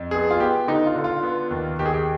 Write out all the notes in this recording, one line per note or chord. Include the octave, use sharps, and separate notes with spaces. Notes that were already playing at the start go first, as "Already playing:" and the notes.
Already playing: F2
B3 G#4
F4
B3 G4
D3 D#4
F4
D3
F4
B3
D#2
D#2 G4
G#4
G4